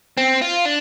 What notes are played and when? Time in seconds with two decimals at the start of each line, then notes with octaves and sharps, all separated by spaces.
0.17 C4
0.41 F4
0.65 D4